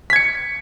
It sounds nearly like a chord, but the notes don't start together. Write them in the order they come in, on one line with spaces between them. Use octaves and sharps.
B6 G#6 C#7